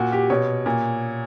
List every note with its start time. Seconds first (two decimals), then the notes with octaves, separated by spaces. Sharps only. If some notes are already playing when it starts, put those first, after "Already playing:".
Already playing: A#2 F#4
0.12 G4
0.30 B2 C#5
0.66 A#2